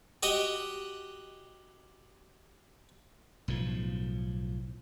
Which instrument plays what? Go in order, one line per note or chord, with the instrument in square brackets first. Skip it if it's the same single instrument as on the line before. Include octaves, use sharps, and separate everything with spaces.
[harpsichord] F#4 G4 D#5 F#5
[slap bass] B1 A2 F3